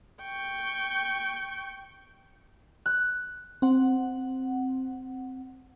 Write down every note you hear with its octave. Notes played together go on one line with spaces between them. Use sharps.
G5 C#6
F#6
C4 F#5